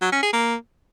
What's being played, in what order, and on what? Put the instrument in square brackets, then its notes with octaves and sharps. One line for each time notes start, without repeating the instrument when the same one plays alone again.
[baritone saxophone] F#3
C#4
G#4
A#3